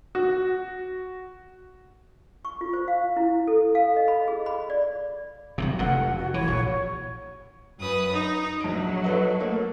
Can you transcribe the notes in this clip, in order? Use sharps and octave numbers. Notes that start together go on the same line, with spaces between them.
F#4
C#6
F4
C5
F5
E4
A4
F5
D#5
B5
G#4
B5
D5
C3 D#3 F#3
F1 F2 A2 F#5
F#4
E3 C#5
A#1
F#2 B4 D#6
D#4 D#6
A#1 F#3 D7
A4 B4 D#5
A3 A#3